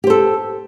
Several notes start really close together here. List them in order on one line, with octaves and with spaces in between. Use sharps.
G4 C5 A4